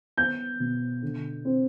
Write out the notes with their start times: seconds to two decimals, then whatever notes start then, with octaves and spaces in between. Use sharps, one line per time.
0.17 B3 G6
0.60 B2
1.02 D3
1.45 C4